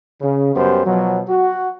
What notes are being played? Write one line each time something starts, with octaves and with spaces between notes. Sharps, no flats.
C#3
F#2 G3 B3 G4 C5
B2 F3 F#3
F#4